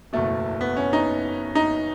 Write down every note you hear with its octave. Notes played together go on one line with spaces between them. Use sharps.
F#1 E2 B2 A3
B3
C#4
D#4
D#4